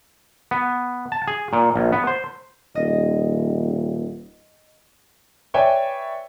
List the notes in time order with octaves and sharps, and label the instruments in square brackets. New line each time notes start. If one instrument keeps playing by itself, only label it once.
[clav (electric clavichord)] B3
A5
G#4
A#2
A#1
B3
C5
[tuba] D#1 [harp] D#5
[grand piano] B4 C#5 D5 E5 G5 G#5